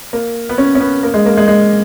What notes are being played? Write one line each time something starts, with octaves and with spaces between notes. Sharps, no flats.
A#3
B3
C#4
C#4
B3
A#3
G#3
A#3
G#3
G#3